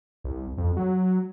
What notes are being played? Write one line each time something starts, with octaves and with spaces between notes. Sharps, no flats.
C2
F2
F#3